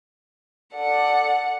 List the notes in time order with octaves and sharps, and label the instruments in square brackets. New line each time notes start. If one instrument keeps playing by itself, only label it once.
[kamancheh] A4 D5 [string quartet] F#5